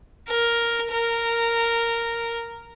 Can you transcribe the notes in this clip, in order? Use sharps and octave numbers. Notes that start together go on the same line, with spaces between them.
A#4
A#4